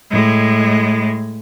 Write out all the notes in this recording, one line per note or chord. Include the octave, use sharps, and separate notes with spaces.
A2 G#3